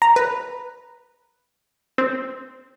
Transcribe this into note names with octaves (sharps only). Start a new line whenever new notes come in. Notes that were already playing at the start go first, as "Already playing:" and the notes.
A#5
B4
C4